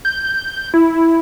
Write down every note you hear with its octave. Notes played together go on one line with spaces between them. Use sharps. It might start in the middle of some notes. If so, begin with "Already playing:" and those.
G6
E4